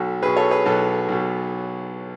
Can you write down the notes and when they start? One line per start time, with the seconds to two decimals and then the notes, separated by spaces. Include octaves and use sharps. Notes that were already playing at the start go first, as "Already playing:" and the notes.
Already playing: B1 B2 F#4 A4
0.22 B1 B2 G#4 B4
0.36 A4 C#5
0.51 G#4 B4
0.65 B1 B2 F#4 A4
1.08 B1 B2